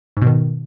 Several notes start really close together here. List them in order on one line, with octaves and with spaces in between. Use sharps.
G#2 B2 D#3